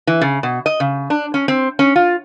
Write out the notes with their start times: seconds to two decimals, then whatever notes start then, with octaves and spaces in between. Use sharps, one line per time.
0.07 E3
0.22 C#3
0.43 B2
0.66 D#5
0.80 C#3
1.10 D4
1.34 C#4
1.48 C4
1.79 C#4
1.96 F4